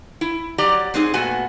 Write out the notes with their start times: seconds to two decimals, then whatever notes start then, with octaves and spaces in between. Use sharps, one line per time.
0.21 E4
0.58 F#3 G4 D5 A#5
0.94 G#3 C4 D#4 F#4 G#4
1.14 A#2 A3 B3 F#4 G#5